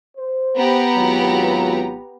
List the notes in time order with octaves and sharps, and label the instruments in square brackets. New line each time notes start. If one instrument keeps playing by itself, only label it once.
[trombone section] C5
[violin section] B3 G4 A#5
[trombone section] G#1 F#3 F4